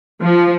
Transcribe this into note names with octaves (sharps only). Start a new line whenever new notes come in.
F3